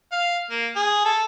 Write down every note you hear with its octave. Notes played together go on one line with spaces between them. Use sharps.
F5
A#3
G#4
A4